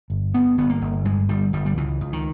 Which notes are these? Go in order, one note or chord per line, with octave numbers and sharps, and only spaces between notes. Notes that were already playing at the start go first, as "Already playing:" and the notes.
G1
G2 B3
G1 B3
A#3
G1
G2 G#3
G1 G3
G1 G3
G3
C#2 E3
C#2
D#3